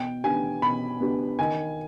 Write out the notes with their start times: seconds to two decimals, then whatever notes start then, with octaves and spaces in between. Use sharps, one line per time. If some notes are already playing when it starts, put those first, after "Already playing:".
Already playing: B2 G5
0.24 B3 D4 G4 G#5
0.62 B2 B5
1.00 B3 D4 G4
1.39 D#3 G#5